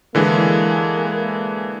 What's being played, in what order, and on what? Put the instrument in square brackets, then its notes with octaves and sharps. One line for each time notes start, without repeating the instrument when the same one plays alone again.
[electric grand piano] D3 E3 G#3 [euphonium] A#3